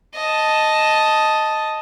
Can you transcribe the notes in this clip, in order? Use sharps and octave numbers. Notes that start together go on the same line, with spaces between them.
D#5 A5